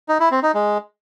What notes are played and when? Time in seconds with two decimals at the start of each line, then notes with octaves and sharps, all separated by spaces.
0.09 D#4
0.20 E4
0.31 C4
0.43 D#4
0.54 G#3